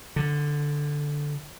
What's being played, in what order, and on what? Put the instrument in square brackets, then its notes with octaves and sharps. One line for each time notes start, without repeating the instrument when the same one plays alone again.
[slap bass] D3